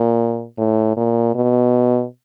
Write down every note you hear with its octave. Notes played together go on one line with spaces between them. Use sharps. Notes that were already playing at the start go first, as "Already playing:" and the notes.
Already playing: A#2
A2
A#2
B2